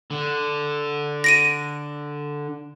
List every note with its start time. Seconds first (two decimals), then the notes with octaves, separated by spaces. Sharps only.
0.11 D3
1.24 A#6 D7 D#7